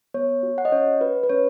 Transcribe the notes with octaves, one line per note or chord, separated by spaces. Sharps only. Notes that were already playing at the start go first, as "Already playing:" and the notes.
B3 C#5
F#4
F#5
D#5
C#4 C#5
F#4 B4
B4
C#4 C#5